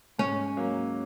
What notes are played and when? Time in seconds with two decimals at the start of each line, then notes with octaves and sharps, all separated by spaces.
0.19 G#2 C#4
0.57 F#3 A#3